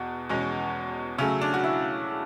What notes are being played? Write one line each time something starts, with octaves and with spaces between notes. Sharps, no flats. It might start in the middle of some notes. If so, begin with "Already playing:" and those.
Already playing: E2 B2
E2 B2 G#3 C#4
C#3 F#3 A3 C#4
D4
F#4
E4